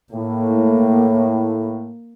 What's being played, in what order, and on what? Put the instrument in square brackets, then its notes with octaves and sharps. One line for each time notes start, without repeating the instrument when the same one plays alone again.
[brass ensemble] A2 [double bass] A#3